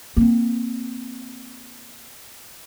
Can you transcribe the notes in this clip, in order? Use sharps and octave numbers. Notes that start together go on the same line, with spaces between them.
A#3 C4